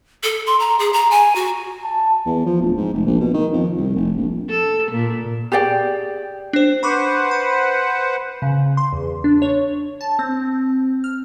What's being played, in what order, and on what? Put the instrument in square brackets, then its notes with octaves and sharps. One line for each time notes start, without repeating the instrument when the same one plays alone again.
[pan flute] A4
C6
A#5
G#4
A#5
G#5
F#4
[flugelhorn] A5
[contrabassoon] E2
F3
D1
G#2
F1
A#1
B2
D#3
F2
C2
F1
A#1
[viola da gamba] A4
A#2
[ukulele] G4 G#4 D5 G5
[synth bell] D4 C5
[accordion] B4 C5 F#5 [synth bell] B5 C#6 D6
[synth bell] B5
[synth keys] C#3
C6
E2
D4
C#5
A5
C4
F6